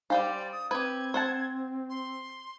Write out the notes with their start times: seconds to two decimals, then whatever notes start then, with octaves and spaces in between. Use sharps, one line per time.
0.10 G3 D4 G4 C5 D5 F5 G#5
0.52 D#6
0.71 C4 G4 B4 G#6
1.14 C5 F#5 A5
1.90 C6